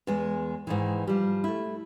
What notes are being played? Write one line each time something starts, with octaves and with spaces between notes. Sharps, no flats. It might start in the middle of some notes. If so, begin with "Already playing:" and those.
E2 G#3
G#2 D#3 E3
F3 G3
A3 E4